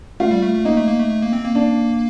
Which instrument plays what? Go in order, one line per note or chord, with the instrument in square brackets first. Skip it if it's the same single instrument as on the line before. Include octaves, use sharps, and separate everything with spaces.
[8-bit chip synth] A3 [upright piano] F4
[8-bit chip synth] G3
A3
A3
[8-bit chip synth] A#3 [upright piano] D#4
[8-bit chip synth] A3
A#3
A3
A3
A#3
C4
A#3
[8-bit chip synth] A#3 [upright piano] D4